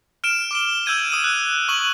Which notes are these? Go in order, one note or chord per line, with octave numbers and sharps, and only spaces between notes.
F6 D7 E7
D6 D7 G7
E6 G6 G#6 D#7
D#6 E6 D#7
F#6
C#6 D#6 F#7